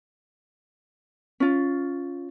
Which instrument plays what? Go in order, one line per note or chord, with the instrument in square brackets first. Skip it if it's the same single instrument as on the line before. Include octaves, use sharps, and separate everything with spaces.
[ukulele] C#4 F4